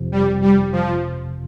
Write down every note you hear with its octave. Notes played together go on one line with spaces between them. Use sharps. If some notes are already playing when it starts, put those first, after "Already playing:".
Already playing: G1 F2 C3 F3
G3
G3
F3